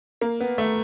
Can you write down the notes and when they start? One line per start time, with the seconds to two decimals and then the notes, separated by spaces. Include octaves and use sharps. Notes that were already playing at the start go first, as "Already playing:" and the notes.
0.21 A#3
0.40 B3
0.58 A3